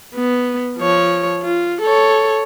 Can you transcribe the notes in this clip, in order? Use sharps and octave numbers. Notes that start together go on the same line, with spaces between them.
B3
F3 C#5
F4
A4 C#5